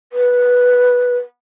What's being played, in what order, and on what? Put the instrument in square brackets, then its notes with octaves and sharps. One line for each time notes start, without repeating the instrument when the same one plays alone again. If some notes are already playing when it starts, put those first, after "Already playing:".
[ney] B4